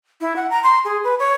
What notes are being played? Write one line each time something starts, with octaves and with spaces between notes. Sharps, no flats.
E4
F#5
A#5
C6
G#4
B4
C#5